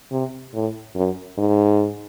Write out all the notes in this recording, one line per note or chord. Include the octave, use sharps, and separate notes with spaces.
C3
A2
F#2
G#2